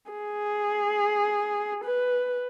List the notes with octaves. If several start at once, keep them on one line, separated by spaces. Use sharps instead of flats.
G#4
B4